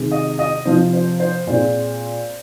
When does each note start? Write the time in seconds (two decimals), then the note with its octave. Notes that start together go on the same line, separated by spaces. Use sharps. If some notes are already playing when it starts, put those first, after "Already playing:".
Already playing: C3 D#3 G#3
0.11 D#5
0.39 D#5
0.65 C3 F3 C4 C5
0.93 C5
1.20 C5
1.47 A#2 G#3 C4